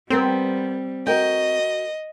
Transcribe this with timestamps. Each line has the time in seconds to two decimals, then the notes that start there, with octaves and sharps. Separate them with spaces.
0.10 G3 B3 C4 A#4 C5
1.07 F#4 A#4 D#5 G5